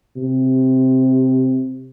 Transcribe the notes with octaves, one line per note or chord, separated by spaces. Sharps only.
C3